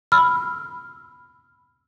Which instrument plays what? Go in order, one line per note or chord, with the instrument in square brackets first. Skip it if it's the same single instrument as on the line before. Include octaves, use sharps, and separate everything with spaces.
[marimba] B5 E6 F6